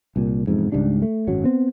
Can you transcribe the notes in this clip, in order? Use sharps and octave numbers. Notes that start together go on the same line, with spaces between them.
C2 A#2
E1 F2 G#2
C#2 G#2 G3 D4
A3
G#1 F#2 F#3
B3 C4